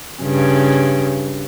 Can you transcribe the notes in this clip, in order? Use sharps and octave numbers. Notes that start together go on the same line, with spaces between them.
G2 C#3